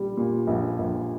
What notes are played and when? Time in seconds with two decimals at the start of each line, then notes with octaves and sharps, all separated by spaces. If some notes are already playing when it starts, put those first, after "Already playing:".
Already playing: A#1 G3
0.17 A#2
0.47 A#1
0.78 A#1